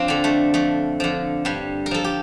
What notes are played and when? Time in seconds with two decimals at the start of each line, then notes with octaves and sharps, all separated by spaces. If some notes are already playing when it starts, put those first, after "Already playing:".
Already playing: F2 C4 D4 F4
0.08 D3 F3
0.24 A3
0.54 F2 A3
1.00 D3 F3
1.45 G2 G3
1.86 A#4
1.91 F3 A4
2.04 G4